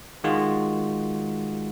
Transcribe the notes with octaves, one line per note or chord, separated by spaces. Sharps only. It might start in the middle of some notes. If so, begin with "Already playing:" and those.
D#3 G#3 F4 F#4